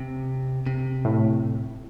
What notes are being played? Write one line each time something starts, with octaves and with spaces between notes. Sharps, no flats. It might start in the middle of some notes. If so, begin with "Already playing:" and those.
Already playing: C3
C3
A2